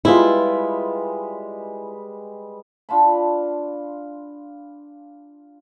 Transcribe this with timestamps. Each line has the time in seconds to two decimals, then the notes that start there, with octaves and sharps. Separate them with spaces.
0.05 G3 G#3 E4 F4 B4
2.89 D4 F4 A5 B5